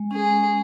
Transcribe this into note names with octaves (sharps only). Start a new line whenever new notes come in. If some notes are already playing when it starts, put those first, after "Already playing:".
Already playing: G#3
C#4 G#4